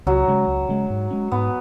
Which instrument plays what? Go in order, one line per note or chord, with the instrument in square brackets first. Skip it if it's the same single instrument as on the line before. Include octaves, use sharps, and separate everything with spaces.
[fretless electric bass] C#2 [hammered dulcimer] F#3
[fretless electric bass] C#3 G#3
C#2
C#3 G#3
G#2
G#3 C#4
[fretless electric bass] G#2 [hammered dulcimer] B3